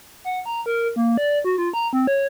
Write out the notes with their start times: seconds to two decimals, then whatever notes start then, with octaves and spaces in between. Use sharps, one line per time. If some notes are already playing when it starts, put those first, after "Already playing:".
0.24 F#5
0.46 A#5
0.66 A#4
0.96 A#3
1.18 D5
1.44 F#4
1.58 F4
1.74 A#5
1.93 C4
2.07 C#5